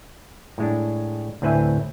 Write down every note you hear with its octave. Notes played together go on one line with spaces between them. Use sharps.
A2 G#3 D4
D2 A2 C4 B4 E5 G#5